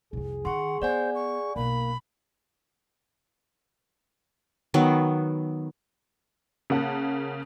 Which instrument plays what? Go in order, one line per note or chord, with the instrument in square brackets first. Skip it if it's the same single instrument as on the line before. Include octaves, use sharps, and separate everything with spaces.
[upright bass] C2 F2 [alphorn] G#4
[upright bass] D#3 [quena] F#5 [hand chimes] C6 C#6
[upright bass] B3 [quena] C5 [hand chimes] D5 F#5 G#5
[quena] C#6
[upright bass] B1 [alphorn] A#3 [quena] B5
[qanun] D#3 F#3 B3
[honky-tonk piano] C#3 A#3 F#5 A5